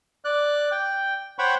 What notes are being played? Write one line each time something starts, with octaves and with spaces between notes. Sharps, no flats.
D5 F#6
G5
C5 C#5 F#5 G5 B5 C#6